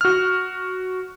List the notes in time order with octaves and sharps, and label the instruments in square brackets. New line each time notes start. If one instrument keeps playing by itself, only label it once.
[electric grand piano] F#4 F6